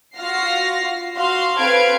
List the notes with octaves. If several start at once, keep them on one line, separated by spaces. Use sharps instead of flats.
F4 F#4 F5 A#6 C7
F#4 F5 C6
C4 A4 B4 F5 G#6 D7